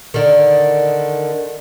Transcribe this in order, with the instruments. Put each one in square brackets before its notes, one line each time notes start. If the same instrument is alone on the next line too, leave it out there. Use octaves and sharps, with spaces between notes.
[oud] D3 D#3